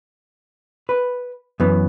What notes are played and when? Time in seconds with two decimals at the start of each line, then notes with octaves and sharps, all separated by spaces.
0.89 B4
1.60 F#2 E3 B3